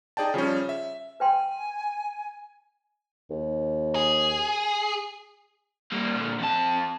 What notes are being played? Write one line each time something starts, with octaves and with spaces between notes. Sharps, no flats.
D#4 G#4 D5 G5 A5
C#3 F3 G3 C#4
E5
B4 G5 G#5 C6
D#2
G#4
G3 A#3
A#2 D3
F2 A5